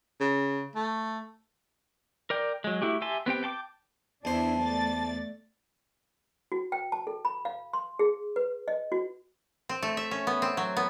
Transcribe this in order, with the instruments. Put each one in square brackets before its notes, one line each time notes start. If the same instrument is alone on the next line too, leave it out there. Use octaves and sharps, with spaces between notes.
[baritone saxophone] C#3
A3
[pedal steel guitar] A#4 D5 G5
F#3 G#3
A3 E4 F#4 G4
G4 E5 G#5 A5 C6
B3 C4 G4 G5
G5 A5 C6 D6
[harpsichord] E2 C5 [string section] D4 E4 [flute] A5
[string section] A3 D5 A6
[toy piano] F#4
G5
A5
A4
B5
F5
C6
G#4
B4
D#5
F#4
[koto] C4
A3
E5
C#4
B3
C4
F#3
B3